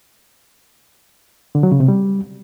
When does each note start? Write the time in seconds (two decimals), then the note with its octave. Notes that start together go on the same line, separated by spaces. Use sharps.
1.55 D3
1.63 F#3
1.72 C#3
1.80 C3
1.88 G3